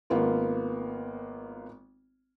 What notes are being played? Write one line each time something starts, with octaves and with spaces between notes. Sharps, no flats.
G#1 A#3 B3 F4